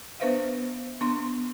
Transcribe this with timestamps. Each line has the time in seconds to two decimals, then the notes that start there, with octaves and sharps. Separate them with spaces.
0.20 B3 D4 B4 C5 E5 F5
1.01 B3 D4 C6